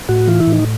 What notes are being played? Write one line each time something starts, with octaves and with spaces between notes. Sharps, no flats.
A2 F#4
E3 F4
E4
A2
D#4